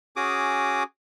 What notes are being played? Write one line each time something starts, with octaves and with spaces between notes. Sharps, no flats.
C#4 F#4 G#4 D6 D#6